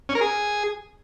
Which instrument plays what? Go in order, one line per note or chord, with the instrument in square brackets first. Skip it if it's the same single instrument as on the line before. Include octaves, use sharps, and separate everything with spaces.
[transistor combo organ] C#4
A#4
G#4